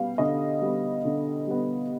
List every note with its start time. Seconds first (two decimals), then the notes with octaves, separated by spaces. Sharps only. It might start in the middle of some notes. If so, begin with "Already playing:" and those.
Already playing: G3 B3 F5
0.18 D3 D#5
0.62 G3 B3
1.05 D3
1.47 G3 B3